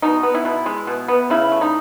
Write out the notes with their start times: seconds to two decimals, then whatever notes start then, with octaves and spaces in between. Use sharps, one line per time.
0.02 B2 D#4
0.23 B3
0.35 E4
0.45 B2
0.66 G#3
0.87 B2
1.08 B3
1.30 C#3 E4
1.52 A3
1.61 D#4